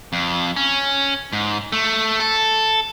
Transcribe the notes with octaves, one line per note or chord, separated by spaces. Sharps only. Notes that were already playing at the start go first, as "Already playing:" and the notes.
F2
C#4
G#2
A3
A4